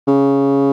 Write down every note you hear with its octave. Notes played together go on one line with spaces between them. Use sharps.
C#3